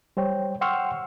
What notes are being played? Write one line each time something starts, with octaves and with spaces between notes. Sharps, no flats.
G3 C5 C#5 G5
F#5 G5 C6 C#6 E6 F6